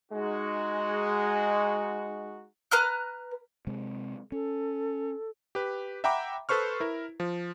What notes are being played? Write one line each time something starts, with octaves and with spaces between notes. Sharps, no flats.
G#3 D#4 F#4
B4 A#5 F6 F#6
C3 G#3 C4
C#4 A4
G4 B4
E5 F#5 G5 A#5 B5 D6
A4 B4 C5 C#6 F6
E4 A#4
F3